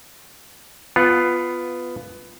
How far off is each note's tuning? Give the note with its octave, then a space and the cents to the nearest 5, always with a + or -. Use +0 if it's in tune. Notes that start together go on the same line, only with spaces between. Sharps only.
B3 +10 F4 +0 F#5 +0